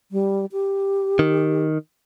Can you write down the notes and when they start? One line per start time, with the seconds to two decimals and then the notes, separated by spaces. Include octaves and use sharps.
0.12 G3
0.52 G4
1.19 D#3